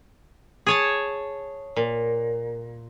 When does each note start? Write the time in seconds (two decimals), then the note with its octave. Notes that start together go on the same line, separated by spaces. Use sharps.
0.67 G#4 C#5 A5
1.76 A#2